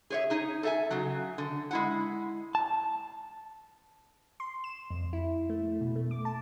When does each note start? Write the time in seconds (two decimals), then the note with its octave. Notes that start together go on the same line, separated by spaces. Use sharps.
0.10 G#4 C#5 E5
0.30 D#4 G#4
0.63 A4 E5 G#5
0.91 C#3 F#3
1.38 D3
1.71 G#3 E4 F#5
2.55 A5
4.40 C6
4.64 E7
4.90 F2
5.13 E4
5.50 A3
5.81 B2
5.96 A3
6.11 D6
6.25 A5